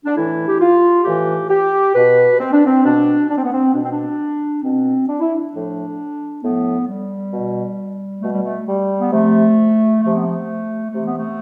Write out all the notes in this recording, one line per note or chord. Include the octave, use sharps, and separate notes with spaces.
D4
A2 E3 E4
G4
F4
A2 E3 G4
G4
B2 B4
C4
D4
C4
B2 D4
D4
C4
B3
C4
B2 D4
C4
D4
B2 C4
D4
E4
D4
A2 F3
A2 F3 B3
G3
B2
B2 A3
G3
A3
G3
B3
C3 F3 A3
C3 F3 A3
B3
A3
C3 E3 A3
B3
A3